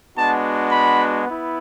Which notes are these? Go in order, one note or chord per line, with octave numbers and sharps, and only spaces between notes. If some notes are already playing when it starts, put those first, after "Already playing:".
G#3 B3 D4 F#4 A5
B5
B3 E4